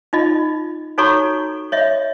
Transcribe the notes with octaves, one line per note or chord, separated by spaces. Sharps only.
D#4 F4 D#5
D#4 F#4 A4 C#5 A#5 C#6
C#5 D#5 E5